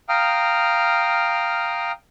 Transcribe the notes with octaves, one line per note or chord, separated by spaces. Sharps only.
F5 G5 A#5 D#6 F6